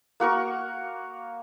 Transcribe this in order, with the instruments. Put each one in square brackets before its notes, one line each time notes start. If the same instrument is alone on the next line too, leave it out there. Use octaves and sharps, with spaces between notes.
[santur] A#3 F#4 A#4 C#6